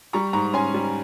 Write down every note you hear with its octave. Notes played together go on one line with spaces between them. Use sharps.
G3 A#5 C#6
G#2 A#5 C#6
C#4 G#5 C6
G3